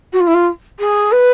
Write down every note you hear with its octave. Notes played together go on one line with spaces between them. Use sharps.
F#4
F4
E4
F4
G#4
B4